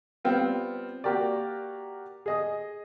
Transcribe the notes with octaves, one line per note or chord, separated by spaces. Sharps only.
G3 B3 C4 F4
A#3 F#4 G4 A#4 D5
G#4 D#5 D#6